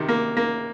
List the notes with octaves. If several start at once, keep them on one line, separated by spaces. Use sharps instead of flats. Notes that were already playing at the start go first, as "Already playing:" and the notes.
Already playing: C3 D#3
A#3
A#3